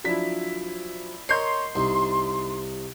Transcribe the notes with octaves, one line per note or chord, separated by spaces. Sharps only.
F3 F#3 D4 E4 B6
A#4 C#5 D#5 A#5 C6 G6 C7
C2 D#4